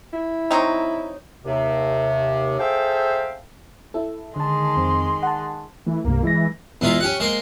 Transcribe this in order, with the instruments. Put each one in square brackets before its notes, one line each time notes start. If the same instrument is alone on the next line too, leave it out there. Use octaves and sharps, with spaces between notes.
[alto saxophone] E4
[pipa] F#3 C4 D#4
[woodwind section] D#2 C3
G#4 A4 C5 E5 F5 G5
[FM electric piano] E4 A4
[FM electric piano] D3 A5 [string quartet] D#3 G#3 C6
[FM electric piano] F2 C4
F#5 A5
[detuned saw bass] E3 [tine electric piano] A3
[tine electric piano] C2 G2 C3 [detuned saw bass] A#3
[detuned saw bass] E3 [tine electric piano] G#3 A#6
[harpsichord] E2 G#3 E4 F4 A#5
C#4 G4 F#5
G#3 A#3 C5 C6